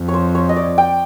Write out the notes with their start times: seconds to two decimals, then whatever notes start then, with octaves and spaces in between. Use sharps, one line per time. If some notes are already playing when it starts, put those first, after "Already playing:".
Already playing: F2
0.08 C#5
0.14 C5
0.35 C#5
0.49 D#5
0.56 D5
0.78 G5